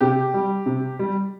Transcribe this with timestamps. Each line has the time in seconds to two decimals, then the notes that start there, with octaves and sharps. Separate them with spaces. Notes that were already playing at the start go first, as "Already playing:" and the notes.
0.01 C3 G4
0.34 G3
0.66 C3
0.99 G3